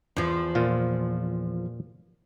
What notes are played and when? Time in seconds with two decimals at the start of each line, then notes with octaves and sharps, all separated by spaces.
0.17 E2 F3
0.55 A#2 F4